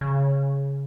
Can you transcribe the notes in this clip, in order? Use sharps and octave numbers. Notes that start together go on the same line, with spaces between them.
C#3